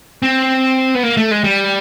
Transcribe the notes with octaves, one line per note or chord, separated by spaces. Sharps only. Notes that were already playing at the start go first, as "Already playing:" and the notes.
C4
B3
A#3
A3
G#3
G3